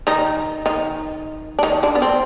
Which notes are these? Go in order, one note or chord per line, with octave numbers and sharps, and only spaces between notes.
D#3 D#4
D#3 D#4
D4
D#3 D#4
D3 D4
B3
C4